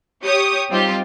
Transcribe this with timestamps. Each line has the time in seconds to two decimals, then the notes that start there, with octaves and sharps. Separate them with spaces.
0.23 G4 C#5 C#6 D#6
0.70 G3 C4 D#4 F4 G4